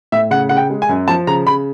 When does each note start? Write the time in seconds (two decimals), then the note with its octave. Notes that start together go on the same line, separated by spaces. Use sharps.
0.12 A2 E5
0.31 C#3 F#5
0.49 C#3 F#5
0.57 G5
0.70 G#3
0.82 G#5
0.89 F#2
1.08 F3 A5
1.27 C#3 A#5
1.47 C#3 B5